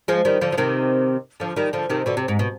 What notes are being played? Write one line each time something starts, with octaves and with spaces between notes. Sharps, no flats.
F3 G#3
D#3 G3
D3 F3
F3
C3 D#3
D3 F3
D#3 G3
D3 F3
C3 D#3
B2 D3
C3
G#2
B2